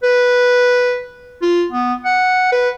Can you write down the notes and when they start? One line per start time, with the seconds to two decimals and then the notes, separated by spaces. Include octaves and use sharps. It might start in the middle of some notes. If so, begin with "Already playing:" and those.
0.03 B4
1.42 F4
1.72 B3
2.04 F#5
2.52 B4